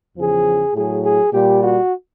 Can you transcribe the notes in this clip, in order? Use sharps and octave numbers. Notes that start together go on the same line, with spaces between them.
E2 C#3 F3 G#4
A2 F#3 G#4
G#4
A#2 G3 G4
F#4